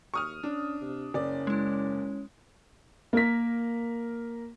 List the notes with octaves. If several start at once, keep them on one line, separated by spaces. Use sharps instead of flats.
D#2 C#6 D#6 F6
C#4 D4
C3
F#1 C#4 D5
G#3 E4
A#3 A#4 B6